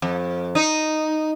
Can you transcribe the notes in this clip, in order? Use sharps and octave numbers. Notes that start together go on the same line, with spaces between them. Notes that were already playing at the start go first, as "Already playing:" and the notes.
F2
D#4